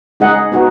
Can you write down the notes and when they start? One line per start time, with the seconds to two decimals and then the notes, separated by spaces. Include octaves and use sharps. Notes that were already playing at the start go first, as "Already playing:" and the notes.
0.20 G#3 D#4 G#4 D#5 F#5
0.52 B3 D#4 F#4